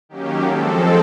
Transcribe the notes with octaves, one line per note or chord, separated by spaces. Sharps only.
D#3 F#3 A#3 C#4 G4
F3 G#3 C4 A4